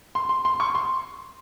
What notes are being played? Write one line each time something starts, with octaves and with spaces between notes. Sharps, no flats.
C6
C6
C6
C#6
C6